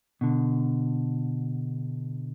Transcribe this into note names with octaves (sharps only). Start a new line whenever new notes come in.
B2 D3